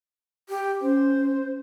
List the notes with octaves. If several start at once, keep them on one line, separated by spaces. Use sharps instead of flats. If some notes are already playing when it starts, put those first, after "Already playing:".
G4
C#4 C5